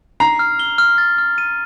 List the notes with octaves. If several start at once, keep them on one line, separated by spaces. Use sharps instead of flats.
A#5 C7
F6
G7
F6
A6
F6
D#7